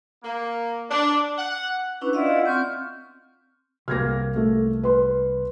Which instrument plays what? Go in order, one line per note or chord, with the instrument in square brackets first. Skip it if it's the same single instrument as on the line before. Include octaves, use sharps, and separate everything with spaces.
[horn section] A#3
D4
F#5
[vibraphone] C#4 D4 E4 [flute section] B4
[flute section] E4 F4 F#5 [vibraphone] D5 D#5 F5
[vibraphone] C4 [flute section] C#6 F6 G6
[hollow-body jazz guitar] C2 A#3 [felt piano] F6 G#6 A#6
[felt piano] A3
B4 C6